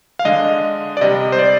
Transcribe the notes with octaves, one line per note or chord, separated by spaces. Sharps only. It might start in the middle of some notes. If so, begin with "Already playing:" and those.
F5
D3 G#3 D#5
D5
C3 G3 D#5
C5
D5